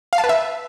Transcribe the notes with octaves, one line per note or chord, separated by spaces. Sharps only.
F5
A5
B4
E5